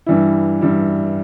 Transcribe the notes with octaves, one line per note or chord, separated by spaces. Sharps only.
G2 E3 G3 E4
G2 E3 G3 E4